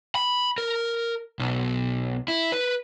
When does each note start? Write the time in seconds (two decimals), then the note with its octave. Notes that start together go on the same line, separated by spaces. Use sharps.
0.15 B5
0.58 A#4
1.39 B1
2.28 E4
2.52 B4